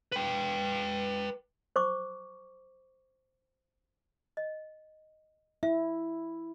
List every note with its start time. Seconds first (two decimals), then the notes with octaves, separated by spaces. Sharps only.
0.12 B4 G5
1.76 C5 C#6 D6
4.37 D#5
5.63 E4 E5